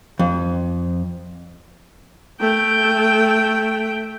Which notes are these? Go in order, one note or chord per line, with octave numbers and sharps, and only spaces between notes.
F2
A3 G5